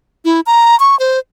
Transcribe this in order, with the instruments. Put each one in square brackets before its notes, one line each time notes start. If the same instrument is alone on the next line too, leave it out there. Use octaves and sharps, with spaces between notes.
[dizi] E4
A#5
C#6
C5